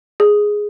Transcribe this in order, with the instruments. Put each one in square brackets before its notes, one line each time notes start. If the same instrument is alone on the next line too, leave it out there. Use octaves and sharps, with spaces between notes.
[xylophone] G#4